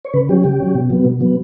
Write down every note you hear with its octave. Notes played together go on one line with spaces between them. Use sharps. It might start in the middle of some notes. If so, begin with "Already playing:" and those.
C#5
C#3 B4
F#3 C#4 G4
C#3 G4
F#3 C#4
B2
F#3 B3
B2
F#3 B3